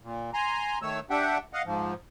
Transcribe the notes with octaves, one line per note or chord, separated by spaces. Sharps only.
A#2
G#5 A#5 C6
D#3 A3 C#5 E6
D4 G4 E5 F#5 G5
D#5 F5 F#5
G#2 F3